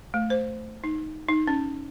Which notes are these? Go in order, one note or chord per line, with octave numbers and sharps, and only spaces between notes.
A3
C5
D#4
D#4
C#4